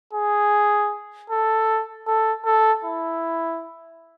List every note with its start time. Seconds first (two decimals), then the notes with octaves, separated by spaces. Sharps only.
0.13 G#4
1.30 A4
2.07 A4
2.45 A4
2.85 E4